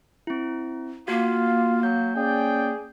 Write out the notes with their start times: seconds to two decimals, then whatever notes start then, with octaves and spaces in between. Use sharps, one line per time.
0.27 C4 E4
1.08 A#3 F4 F#4
1.83 F#3 G6
2.16 C#4 G#4 D5 G5